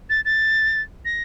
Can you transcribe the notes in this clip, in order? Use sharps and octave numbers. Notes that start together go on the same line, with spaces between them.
A6
A6
A#6